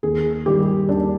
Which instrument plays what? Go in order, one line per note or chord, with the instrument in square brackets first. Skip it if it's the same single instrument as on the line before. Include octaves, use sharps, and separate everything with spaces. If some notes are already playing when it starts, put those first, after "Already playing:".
[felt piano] D#2 G#4
D#3 G3 G4
D#2 D4